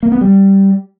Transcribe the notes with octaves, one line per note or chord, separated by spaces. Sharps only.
A#3
B3
G3